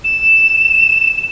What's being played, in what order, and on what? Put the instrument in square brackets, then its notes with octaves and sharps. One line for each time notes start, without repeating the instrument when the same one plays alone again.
[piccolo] E7